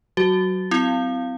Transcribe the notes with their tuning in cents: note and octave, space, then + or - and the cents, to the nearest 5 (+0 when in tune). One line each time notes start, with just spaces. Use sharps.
F#3 +15 F#4 +0
C4 -35 E4 +0 F5 +0